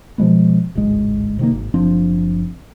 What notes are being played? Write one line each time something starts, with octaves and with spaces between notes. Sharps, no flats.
B2 F3 G#3 B3
D1 G#1 C#2 G#3
C3 D#3 A#3
G#1
F#1 F3 C4 D4